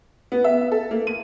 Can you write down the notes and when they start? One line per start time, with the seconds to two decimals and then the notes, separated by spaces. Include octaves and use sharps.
0.32 B3
0.44 E5
0.71 A4
0.91 A#3
1.07 D#7